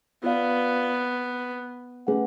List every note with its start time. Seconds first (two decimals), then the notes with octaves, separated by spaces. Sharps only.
0.23 B3 F4 B4 D5 F5
2.07 A3 C#4 G#4 B4 F#5